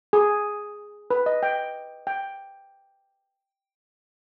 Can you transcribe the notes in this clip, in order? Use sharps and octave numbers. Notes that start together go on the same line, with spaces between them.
G#4
B4
D#5
G5
G5